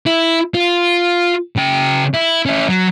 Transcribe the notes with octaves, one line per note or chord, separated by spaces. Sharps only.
E4
F4
C#3 G5
E4
C#4 E4
F#3